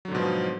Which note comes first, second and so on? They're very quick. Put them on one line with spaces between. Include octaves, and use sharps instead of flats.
F#3 D3 G#2 B2 F3